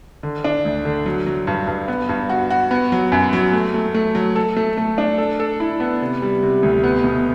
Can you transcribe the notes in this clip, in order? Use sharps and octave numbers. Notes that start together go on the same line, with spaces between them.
D3
D4
D2
D3
F#3
F#3
G2
G2
B3
G2
F#4
F#4
B3
F#3
F#2
F#3
A3
A3
A3
F#3
A4
A3
A3
D4
A4
A4
E4
B3
C3
G3
C3
D2
B3
B2